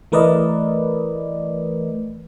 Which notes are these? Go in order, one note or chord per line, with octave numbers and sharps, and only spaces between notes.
E3 A3 A#4 B4 D5 D#5